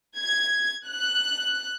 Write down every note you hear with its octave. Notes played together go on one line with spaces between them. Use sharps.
G#6
F#6